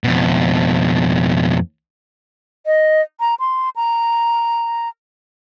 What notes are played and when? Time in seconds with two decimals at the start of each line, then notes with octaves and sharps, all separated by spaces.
0.04 F2 B2
2.66 D#5
3.20 A#5
3.40 C6
3.76 A#5